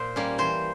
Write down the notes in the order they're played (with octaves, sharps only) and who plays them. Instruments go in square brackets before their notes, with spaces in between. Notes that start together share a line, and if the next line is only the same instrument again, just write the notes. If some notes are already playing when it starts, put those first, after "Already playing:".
Already playing: [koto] A#2 C5
G3 A#3 C#4
E3 C5